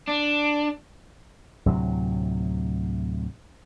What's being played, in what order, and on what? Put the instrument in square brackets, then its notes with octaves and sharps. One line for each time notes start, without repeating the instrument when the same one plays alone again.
[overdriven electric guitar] D4
[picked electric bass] D2 A2 C3 F#3